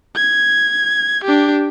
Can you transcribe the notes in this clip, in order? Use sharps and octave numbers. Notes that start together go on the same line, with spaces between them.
G#6
D4 G4